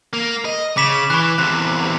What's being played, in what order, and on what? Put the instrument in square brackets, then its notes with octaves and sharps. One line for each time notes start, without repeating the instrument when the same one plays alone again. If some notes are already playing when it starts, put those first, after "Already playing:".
[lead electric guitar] A#3
D#5
[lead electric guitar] C#3 [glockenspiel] D6 B6 E7
[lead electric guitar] E3 [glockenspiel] C#6 F#6
[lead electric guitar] E2 C3 [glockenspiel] F#6